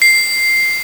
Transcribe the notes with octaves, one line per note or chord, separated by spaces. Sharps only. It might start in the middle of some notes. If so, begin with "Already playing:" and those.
C7